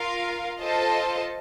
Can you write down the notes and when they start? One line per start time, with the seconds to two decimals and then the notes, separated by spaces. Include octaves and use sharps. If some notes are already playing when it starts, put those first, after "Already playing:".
Already playing: F4 A#4 F5
0.61 F4 A4 C5 D#5 A5